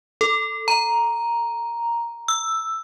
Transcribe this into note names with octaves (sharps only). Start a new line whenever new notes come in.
A4
A#5
E6